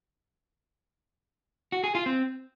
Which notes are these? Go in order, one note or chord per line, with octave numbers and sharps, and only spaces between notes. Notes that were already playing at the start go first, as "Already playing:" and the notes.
F#4
G#4
F4
C4